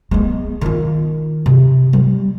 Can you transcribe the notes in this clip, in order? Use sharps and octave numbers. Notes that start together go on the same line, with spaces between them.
G#3 B3
D#3 F4
C3
G3